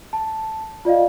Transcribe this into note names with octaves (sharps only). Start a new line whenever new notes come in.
A5
F4 D5 D#5 F5